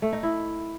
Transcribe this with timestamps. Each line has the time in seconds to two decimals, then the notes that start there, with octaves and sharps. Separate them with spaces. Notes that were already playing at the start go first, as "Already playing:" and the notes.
0.02 A3
0.13 D#4
0.23 E4